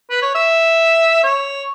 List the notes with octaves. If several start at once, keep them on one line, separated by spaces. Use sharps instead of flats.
B4
C#5
E5
C#5